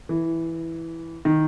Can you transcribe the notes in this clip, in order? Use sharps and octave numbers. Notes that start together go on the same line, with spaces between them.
E3
D#3